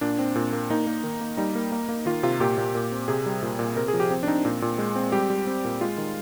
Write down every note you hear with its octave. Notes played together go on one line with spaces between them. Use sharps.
A#2 D4
C4
A#2
A#3
A#3 D#4
A#3
D#3
A#3
G3 D#4
A#3
A#3
A#3
D#3 F4
C3 F4
A#2 G4
A#2
A#2
C4
C3 G#4
G3
A#2
A#2
C3 A#4
G#4
F3
G4
C4
D4
C4 D#4
A#2
A#2
G#3
C4
G3 G4
G3
C4
A#2
G#3 F4
D#3